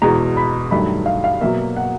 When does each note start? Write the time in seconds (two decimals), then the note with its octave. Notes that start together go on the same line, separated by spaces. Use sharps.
0.02 E2 B2 G#3 A#5
0.37 B5
0.71 G2 D#3 F#3 A3 B5
1.06 F5
1.24 F5
1.41 B2 F#3 A#3 E5
1.76 F#5